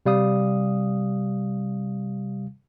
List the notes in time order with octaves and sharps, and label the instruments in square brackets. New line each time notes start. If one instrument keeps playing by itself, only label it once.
[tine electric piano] C3 G3 F5 D#6